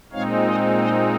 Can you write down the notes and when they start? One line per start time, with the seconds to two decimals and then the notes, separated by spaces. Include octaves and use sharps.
0.12 A#2 G#3 C4 D#4 C#5 F5
0.46 C5 D#5
0.79 C5 D#5